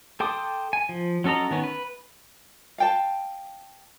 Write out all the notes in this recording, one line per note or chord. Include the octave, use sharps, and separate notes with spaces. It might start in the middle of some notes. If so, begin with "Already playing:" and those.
A4 G5 C6 D6 D#6
G#5
F3
F#3 C#4 A4 D#5 A#5
D#3 B3 C#4
B4
F5 G5 A5